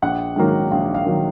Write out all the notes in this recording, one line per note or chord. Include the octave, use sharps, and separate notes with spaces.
A#1 F#5
G#2 D#3 F#3 A#3
A#1 F5
F5
D#3 F#3 A#3